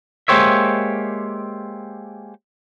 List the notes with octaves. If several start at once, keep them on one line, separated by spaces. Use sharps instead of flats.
G#3 A#3 G4 C5 C#5 E5